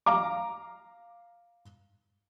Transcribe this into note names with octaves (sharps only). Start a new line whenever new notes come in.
F5 A#5 D6